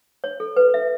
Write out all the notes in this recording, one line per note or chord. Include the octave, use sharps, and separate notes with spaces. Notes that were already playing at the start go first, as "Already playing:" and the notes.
C#5
A4
B4
E5